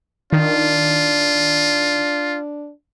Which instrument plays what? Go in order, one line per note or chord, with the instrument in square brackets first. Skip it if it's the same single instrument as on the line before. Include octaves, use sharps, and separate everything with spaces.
[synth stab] D#3 [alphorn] D4 [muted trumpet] F4